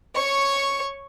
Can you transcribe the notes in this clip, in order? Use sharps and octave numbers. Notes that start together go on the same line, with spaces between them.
C#5 C#6